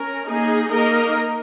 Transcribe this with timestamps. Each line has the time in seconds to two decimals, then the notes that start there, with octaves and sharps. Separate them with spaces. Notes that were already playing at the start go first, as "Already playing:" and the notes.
Already playing: C#4 A#4
0.27 A#3 D#4 G#4 D#5
0.70 A#3 D#4 A#4 D#5